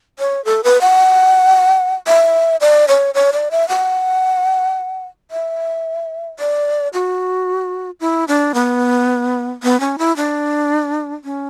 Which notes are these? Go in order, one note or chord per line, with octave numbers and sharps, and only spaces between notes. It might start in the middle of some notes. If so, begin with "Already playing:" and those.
C#5
A4
B4
F#5
E5
D5
C#5
C#5
D5
E5
F#5
E5
D5
F#4
E4
D4
B3
B3
C#4
E4
D4
C#4